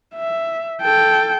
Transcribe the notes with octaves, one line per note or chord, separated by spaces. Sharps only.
E5
A4 G5